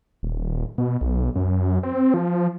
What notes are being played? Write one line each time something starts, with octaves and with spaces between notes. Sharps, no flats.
D#1
B2
B1
F#2
C4
F3